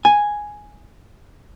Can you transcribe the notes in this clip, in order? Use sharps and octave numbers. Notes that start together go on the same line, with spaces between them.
G#5